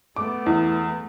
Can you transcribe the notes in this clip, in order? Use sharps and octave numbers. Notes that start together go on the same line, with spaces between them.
A3 B3 D6
E2